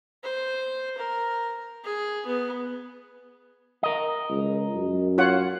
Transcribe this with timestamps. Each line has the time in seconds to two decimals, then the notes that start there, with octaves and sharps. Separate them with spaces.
0.24 C5
0.98 A#4
1.84 G#4
2.26 B3
3.83 A#4 D#5
4.30 C#2
4.75 F#2
5.18 F4 C#5 F#5